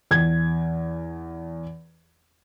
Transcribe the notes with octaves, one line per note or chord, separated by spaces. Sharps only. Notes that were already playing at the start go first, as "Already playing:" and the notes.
E2 G#6